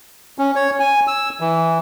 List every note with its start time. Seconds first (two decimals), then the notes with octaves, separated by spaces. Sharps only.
0.39 C#4
0.56 C#5
0.80 G#5
1.08 E6
1.41 E3